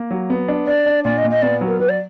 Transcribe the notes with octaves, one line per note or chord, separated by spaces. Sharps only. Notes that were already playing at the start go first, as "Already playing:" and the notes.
Already playing: A#3
F#3
B3
D4
D4 D5
D4
A#2 D5
D#5
A#2
D#5
B3 D5
F#3
A#4
F#3 B4
D5